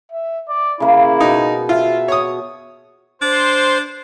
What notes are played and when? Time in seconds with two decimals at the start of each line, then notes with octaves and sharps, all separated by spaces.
0.11 E5
0.49 D5
0.80 C#3 A#3 E4
1.20 B2 D#4
1.69 F4 E5
2.08 C#5 D#6
3.22 D4 C5